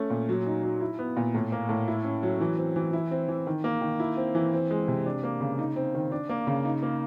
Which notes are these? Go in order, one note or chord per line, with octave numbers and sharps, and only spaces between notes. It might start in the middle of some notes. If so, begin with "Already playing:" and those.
Already playing: A3 C#4
A#2
F#3
D#4
F#3
E4
B3
A#2
A2
A#3
A2
E4
C#4
F#3
E3
C4
E3
E4
C4
E3
D#3
A#3
D#3
E4
C4
E3
C4
G#3
C3
D4
A#3
C#3
D#4
C4
D#3
D4
A#3
C#3
D#4
A#3